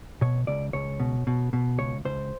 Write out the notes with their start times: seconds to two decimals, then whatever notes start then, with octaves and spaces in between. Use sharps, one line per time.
0.21 B2 C#5
0.47 C#2 D5
0.73 C#2 C#5
1.00 B2
1.27 B2
1.53 B2
1.79 C#2 C#5
2.05 C#2 C5